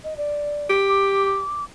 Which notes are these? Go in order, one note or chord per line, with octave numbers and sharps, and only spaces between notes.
D#5
D5
G4
D6